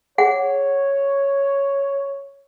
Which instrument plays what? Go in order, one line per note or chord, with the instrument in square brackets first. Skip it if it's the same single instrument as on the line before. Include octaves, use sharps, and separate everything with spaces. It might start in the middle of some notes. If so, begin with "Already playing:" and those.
[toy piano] G#4 F#5 [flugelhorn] C#5